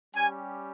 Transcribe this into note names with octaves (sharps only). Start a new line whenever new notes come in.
G3 C#4 G4 G#5